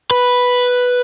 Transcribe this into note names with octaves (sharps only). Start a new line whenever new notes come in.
B4